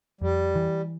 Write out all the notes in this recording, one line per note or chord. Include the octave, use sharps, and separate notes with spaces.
F2 G3
E3